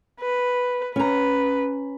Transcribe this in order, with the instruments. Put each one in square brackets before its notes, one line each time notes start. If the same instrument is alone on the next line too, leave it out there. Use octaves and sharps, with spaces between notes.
[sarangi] B4
[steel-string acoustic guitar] C#4 A#5 [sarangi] B4